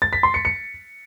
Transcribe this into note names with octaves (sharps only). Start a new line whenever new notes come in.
A6
B6
C6
C#7
C#7